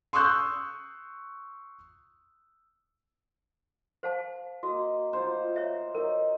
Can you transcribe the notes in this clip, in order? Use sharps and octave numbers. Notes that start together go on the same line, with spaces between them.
C6 C#6 D#6 E6 F#6 G6
C5 F5 A5
A#3 F#4 D#5
D#4 F4 C5 F#5
C#5 E5
F#3 D#4 A#4 D#5